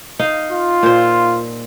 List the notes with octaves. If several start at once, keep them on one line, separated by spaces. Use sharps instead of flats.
D#4 D#5 F5
F4
A#2 C5